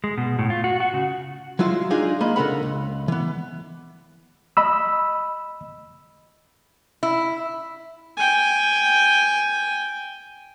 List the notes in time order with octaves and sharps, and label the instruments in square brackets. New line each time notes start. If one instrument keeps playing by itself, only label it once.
[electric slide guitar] G#3
B2
A2
F4
F#4
F#4
C#3
[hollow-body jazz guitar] F#3 G#3 E4 F4
D4 D#4 F4 G#4
G#3 A#3 D#5 B5
C#3 D4 A4 A#4 F#5 B5
C#2
E3 B3
[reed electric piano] D#5 B5 E6
[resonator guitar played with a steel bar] E4
[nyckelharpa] G5 G#5